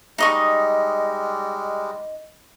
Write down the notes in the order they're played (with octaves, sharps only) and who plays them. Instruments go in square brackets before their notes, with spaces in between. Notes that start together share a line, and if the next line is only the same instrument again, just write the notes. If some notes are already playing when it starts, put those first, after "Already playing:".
[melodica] G3 G#3 [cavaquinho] D#4 D#5 C#6